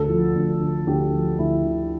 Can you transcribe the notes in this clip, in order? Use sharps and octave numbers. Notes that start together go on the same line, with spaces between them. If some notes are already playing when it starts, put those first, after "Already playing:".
Already playing: D2 A4
F3
D2
D3
D2 G4
F3
D2 E4
D3